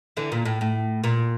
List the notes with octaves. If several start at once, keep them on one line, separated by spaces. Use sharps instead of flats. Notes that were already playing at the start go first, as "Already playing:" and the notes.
D3 E3
A#2
A2
A2
A#2